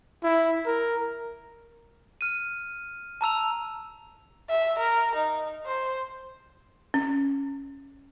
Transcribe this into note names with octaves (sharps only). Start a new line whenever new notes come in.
E4
A#4
F6 D#7
A5 A#5 E6 F7
E5
A#4
D#4
C5
C#4